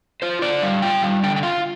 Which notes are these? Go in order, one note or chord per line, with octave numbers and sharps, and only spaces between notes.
F4 C5
D3 D5
G3 F5
F4 G5
G3 F5
D3 G5
G5
F4 F5